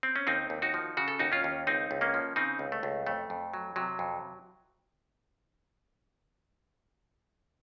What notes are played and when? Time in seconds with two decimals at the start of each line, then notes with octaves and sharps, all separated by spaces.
0.03 C4
0.16 C#4
0.27 D#2 C4 D#4
0.50 D#2
0.62 D#4 F#4
0.74 F3
0.97 C#3 F#4
1.08 A4
1.19 D#2 D#4 F#4
1.32 C#4 F4
1.44 D#2
1.67 C#2 C4 D#4
1.91 C#2
2.01 A#3 C#4
2.14 F3
2.36 C#3 C4 D#4
2.59 C#2
2.72 A3
2.83 C#2
3.07 F2 A3
3.30 F2
3.54 F#3
3.76 C3 F#3
3.99 F2